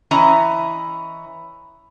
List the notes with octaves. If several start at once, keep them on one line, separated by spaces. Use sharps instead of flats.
E3 C#4 E4 D#5 A#5